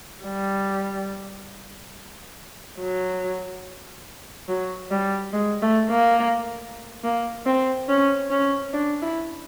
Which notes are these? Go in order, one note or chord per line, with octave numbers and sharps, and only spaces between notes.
G3
F#3
F#3
G3
G#3
A3
A#3
A#3
C4
C#4
C#4
D4
E4